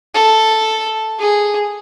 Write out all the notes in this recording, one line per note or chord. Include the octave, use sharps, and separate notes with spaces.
A4
G#4